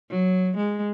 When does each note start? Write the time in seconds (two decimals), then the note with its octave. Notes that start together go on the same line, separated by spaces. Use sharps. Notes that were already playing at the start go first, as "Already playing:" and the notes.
0.10 F#3
0.57 G#3